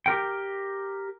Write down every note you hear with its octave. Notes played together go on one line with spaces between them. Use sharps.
G4 A#4 G5